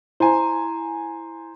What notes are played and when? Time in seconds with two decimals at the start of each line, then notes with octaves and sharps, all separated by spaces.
0.20 E4 C5 G#5 A#5